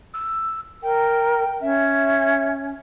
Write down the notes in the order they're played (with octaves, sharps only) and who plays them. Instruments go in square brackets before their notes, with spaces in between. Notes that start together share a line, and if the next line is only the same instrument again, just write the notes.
[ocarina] E6
[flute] A#4 [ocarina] G5
[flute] C#4 [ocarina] E5